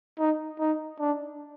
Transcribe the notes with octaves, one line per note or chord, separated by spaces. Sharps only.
D#4
D#4
D4